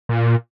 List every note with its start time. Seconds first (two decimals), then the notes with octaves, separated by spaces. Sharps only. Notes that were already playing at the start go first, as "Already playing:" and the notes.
0.09 A#2